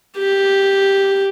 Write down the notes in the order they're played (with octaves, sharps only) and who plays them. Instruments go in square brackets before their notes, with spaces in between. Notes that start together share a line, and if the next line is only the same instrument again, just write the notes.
[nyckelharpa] G4